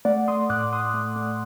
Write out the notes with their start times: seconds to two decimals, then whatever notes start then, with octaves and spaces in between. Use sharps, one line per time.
0.05 A3 D5 F#5
0.28 A3 C6 D#6
0.49 A2 D6 F#6
0.73 A2 C6 D#6
0.94 A3
1.16 A3